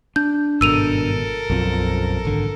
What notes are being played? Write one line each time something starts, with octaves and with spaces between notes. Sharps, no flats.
D4 G6
G#1 G2 B2 A4 A#4 E6 D#7 F7
B1 F#2 F3 C4
G#1 D3